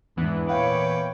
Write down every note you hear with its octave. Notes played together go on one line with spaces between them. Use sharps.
E2 G#2 E3 B3 D4 F#6
A#2 B4 C#5 F5 G5 D6